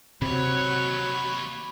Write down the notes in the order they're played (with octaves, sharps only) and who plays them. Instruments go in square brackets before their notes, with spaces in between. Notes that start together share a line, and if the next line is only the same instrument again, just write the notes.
[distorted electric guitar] D#2 C#5 [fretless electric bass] C3 [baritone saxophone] F#3 [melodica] B5